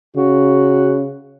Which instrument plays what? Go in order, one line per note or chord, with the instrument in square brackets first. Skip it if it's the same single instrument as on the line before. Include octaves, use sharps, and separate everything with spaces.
[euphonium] C#3 [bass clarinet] F#4